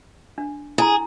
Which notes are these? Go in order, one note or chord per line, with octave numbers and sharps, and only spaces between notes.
D4
E4 G#4 G#5 A#5